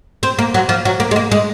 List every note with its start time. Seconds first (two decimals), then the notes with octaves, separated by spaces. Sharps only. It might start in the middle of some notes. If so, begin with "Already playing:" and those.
0.23 C4
0.39 A#3
0.54 F#3
0.69 F3
0.85 F#3
1.00 A#3
1.11 G#3
1.16 A#3
1.32 G#3